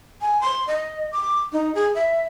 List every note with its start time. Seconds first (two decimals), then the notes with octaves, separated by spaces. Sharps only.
0.21 G#5
0.41 C6
0.68 D#5
1.12 D6
1.53 D#4
1.75 G#4
1.95 E5